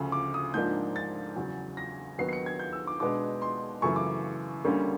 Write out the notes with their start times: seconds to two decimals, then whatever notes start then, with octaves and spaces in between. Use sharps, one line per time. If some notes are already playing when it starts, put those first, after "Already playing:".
Already playing: D2 C#3 F3
0.12 D6
0.34 D#6
0.54 G#2 F3 A#3 D4 G6
0.96 A6
1.36 E2 C#3 F#3
1.77 A#6
2.18 D#2 D#3 F#3 B3 C7
2.29 C7
2.33 C#7
2.46 G#6
2.59 G6
2.73 E6
2.87 D6
3.00 B2 G#3 B3 D4 D6
3.42 C6
3.82 F#2 C#3 E3 A3 C#6
3.96 D6
4.65 D2 D3 G3 A#3 C#4